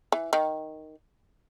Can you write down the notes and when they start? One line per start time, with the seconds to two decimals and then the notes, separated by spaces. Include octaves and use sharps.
0.12 E3
0.33 D#3